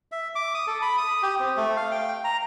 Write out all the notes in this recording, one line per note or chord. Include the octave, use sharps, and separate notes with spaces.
E5
D6
D#6
A4
B5
D#6
G4
C4
A3
F5
G5
A#5